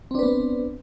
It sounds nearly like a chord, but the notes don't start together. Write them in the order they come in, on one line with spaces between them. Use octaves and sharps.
C4 D4 B4 B3